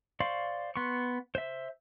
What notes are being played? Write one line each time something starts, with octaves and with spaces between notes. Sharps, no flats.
C5 D5 F5 C6 C#6
B3 C6 C#6
C5 E5